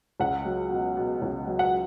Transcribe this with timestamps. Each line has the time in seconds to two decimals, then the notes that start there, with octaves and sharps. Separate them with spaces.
0.20 C#2 F#5
0.45 F#3
0.70 B2
0.97 B2
1.22 C#2
1.47 F#3
1.59 F#5